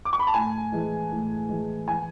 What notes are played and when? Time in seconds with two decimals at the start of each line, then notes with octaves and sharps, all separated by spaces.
0.05 D6
0.13 C#6
0.20 B5
0.27 A5
0.34 A2 G#5
0.72 E3 G#3
1.11 A2
1.49 E3 G#3
1.87 E3 G#5